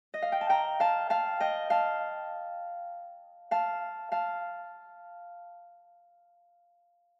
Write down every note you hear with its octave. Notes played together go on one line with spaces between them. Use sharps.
D#5
F5
G5
A5
G5 A#5
F5 A5
F5 A5
D#5 G5
F5 A5
F5 A5
F5 A5